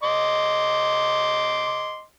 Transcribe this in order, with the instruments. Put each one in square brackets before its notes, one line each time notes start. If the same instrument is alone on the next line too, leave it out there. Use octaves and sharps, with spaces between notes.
[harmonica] D#5 C6 D6